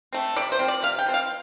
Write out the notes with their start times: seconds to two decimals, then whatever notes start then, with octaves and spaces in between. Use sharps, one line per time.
0.13 A3 C4
0.37 C3 D5
0.52 C5
0.59 F3 C4
0.68 D5
0.83 C3 F5
0.99 G5
1.06 F3 C4
1.14 F5